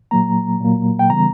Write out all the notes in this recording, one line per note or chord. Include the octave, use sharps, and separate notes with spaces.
A#2 F#3 A#3 A#5
A#2 F#3 A#3
G5
C#3 E3 G3 B3 A#5